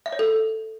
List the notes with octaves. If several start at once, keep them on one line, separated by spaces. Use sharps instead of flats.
E5
C#5
A4